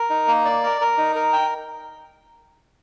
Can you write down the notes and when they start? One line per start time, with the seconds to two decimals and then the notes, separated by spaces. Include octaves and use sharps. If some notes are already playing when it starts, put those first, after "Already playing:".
Already playing: A#4
0.10 D#4
0.28 A#3
0.45 D5
0.63 A#4
0.81 A#4
0.98 D#4
1.15 A#4
1.33 G5